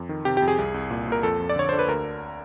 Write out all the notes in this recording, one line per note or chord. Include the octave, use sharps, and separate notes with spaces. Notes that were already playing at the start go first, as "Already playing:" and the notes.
Already playing: F2
D#3
C3 G4
G4
F2
G#4
C2
C2
A#2
A#2 A#4
F2 A4
F2
D5
D3 C#5
D3 C5
B4
D2 A#4